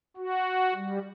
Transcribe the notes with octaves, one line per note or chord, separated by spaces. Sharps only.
F#4
G3